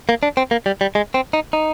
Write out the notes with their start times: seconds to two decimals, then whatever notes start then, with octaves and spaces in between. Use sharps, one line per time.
0.09 A#3
0.23 D4
0.37 C4
0.51 A#3
0.66 G3
0.81 G3
0.95 G#3
1.14 C4
1.33 D#4
1.53 D#4